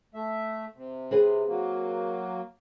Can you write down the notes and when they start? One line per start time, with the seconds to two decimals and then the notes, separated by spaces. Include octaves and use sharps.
0.14 A3 E5
0.76 C3
1.11 C4 G#4 B4
1.48 F#3 A#3